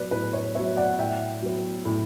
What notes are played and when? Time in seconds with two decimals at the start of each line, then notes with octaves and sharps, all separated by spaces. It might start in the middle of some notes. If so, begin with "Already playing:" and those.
Already playing: F#3 B3 B4 D5
0.11 A2 B4
0.33 C#5
0.55 B3 C#5 E5
0.59 F#3
0.77 D5 F#5
0.98 A2 E5 G5
1.42 F#3 B3
1.85 A2